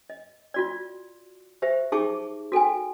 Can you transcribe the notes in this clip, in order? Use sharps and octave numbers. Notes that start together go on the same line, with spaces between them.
D#5
F4 F#4 D5
G4 C5 E5
D#4 G4 G#4 A5 C#6 D6
F#4 A4 G5 G#5